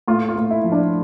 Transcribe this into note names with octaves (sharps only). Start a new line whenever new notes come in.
A2 F4
F4
A2
E4
F3
D4